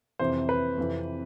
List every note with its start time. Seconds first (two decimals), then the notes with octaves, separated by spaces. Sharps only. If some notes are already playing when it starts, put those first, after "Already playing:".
0.19 F2 C3 E3 C5
0.49 B4
0.77 F2 C3 E3